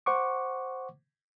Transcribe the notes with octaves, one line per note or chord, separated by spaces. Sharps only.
C5 F#5 C#6 D6